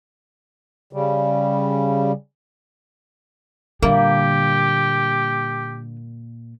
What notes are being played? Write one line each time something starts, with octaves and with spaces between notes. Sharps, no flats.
C#3 G3
A#2 D3 G3 A#3 G4